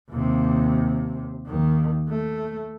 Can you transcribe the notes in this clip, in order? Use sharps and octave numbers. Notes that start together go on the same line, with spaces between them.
D#2 C3
D#2 D#3
A3